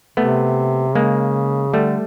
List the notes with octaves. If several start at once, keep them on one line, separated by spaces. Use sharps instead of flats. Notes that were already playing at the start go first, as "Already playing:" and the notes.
C3 A3 B3
C#3 G#3 A#3
D3 G3 A3